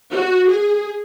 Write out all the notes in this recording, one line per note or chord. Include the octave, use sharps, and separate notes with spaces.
F#4
G#4